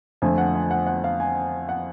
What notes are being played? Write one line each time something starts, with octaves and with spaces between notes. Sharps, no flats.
F2 D3 F3 A3 G#5
F#5
G#5
F#5
F#5
F5
G#5
F#5